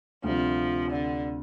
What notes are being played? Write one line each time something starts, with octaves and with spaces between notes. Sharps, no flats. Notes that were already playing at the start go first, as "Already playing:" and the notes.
D2 C3 F3 G3 D4
D3